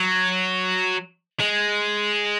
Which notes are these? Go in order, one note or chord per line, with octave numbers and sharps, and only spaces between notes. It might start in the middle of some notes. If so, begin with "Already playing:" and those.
Already playing: F#3
G#3